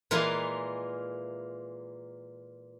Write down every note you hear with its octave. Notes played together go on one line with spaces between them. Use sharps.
A#2 E3 G#3 F4 A#4 B4